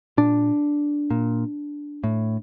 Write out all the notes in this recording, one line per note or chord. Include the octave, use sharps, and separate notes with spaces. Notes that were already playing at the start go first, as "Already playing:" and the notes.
A#2 D4
A#2
A2